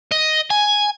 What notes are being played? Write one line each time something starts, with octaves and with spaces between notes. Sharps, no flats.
D#5
G#5